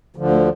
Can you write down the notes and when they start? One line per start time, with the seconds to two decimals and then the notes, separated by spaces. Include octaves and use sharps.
0.16 D2 D3 F3
0.32 A3